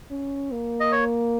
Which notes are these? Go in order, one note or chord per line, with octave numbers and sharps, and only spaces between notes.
C#4
A#3
D#5
C#5